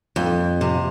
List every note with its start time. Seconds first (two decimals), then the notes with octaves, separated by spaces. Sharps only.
0.16 F2
0.61 C3